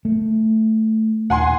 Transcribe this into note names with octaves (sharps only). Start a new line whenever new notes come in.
A3
D#1 F#5 G#5 C6